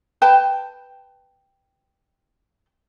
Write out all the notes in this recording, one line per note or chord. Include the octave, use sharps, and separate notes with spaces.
B4 G5 A5